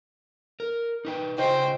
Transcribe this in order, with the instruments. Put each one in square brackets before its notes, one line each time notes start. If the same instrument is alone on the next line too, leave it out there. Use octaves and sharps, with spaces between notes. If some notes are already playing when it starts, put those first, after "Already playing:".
[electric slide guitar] A#4
D#4 B4 G5
[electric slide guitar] C#3 F4 D#5 [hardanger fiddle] C5 G5